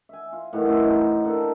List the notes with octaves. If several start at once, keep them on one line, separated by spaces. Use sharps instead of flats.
E5 G#5
F4
A2 D#3 E3 F#4
A2 C#4 E4 C5
D#4 F#4 C6
A#3 D4 D#4 A4